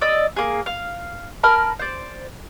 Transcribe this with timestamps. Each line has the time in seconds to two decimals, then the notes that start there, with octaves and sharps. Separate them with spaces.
0.01 D5 D#5 E6
0.36 A#3 G#4
0.66 F5
1.43 A#4 A5 B5 F6
1.79 C5 D5